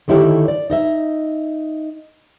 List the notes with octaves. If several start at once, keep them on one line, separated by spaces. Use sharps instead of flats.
D3 D#3 A3 E4 G4 C#5
D5
D#4 D#5 E5